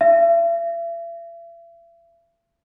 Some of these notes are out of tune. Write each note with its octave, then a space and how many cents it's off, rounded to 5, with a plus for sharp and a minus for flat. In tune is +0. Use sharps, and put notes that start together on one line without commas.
E5 +40